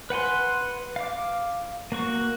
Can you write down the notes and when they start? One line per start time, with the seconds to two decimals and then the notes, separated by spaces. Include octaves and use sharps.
0.10 B4 F#5 G#5 C6
0.96 F5 D6
1.92 A#3 F#4 C#6